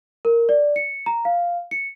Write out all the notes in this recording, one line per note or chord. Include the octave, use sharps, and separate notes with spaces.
A#4
D5
C#7
A#5
F5
C#7